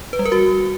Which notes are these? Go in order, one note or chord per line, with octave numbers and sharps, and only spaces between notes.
B4
G3
A#4
F#4